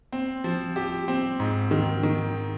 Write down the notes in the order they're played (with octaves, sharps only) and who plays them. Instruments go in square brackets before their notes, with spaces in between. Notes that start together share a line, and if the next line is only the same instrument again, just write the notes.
[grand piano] C4
F3
G4
C4
G#2
D#3
D#3